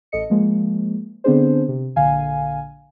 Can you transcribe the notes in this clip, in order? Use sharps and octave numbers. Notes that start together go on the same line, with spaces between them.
A1 A4 D#5 C#7
F3 G#3 A#3
D3 B3 C4 D4 G#4 C5
C3
A#1 D3 F5 G#5